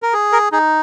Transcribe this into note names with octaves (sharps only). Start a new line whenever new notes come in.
A#4
G#4
A#4
D#4 G#4